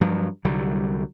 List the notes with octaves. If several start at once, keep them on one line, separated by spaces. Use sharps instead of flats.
G2 F3 F#3
C2 D3 F#3 G3